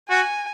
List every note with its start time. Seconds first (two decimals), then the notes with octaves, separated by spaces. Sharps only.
0.09 F#4 G#5